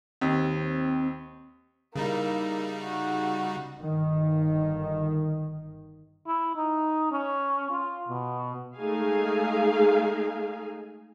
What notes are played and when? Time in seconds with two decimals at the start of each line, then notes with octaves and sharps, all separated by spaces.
0.21 D#2 C4
1.96 C#3 G3 A#3 D#4 E4
2.83 F#4
3.81 G1 D#3
6.27 E4
6.56 D#4
7.12 C#4
7.71 F4
8.09 B2
8.77 G#3 A3 D#4 G#4 F5 G#5